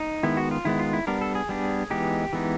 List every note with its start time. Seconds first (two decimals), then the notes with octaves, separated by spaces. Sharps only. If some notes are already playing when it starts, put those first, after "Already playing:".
Already playing: D#4
0.23 D#3 G#3 B3 E4
0.37 F#4
0.51 F4
0.65 D#3 G#3 B3 E4
0.79 F4
0.93 E4
1.07 G3 B3 D4 A#4
1.21 A4
1.35 G#4
1.49 G3 B3 D4
1.90 E3 G#3 B3 D#4 G4
2.33 E3 G#3 B3 D#4